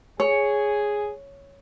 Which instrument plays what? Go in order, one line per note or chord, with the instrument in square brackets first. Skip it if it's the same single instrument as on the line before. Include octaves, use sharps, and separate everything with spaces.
[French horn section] G#4 [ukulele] C#5